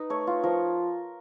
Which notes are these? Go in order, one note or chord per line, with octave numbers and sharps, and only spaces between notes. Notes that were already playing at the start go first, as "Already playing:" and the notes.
Already playing: D#4 B4
A3 C#5
F4
F3 A#4